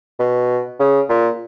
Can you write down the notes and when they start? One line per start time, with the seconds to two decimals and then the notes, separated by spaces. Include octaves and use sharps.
0.20 B2
0.80 C#3
1.09 A#2